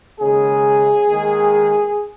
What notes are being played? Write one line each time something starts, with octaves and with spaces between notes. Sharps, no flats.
D#2 C#3 G#3 G#4
D#2 D#3 G#3